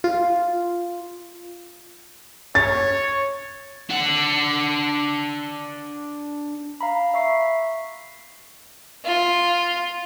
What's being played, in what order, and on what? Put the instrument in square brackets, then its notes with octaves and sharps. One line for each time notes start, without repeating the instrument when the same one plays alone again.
[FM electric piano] F4
[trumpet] C#5 [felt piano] A6
[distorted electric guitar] D4 F#5
[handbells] F5 A#5 B5
E5 C#6 C7
[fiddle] F4